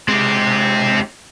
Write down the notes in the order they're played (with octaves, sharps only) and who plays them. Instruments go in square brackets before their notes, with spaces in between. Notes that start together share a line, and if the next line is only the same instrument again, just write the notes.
[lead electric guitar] B1 G#3 [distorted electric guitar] C4 G4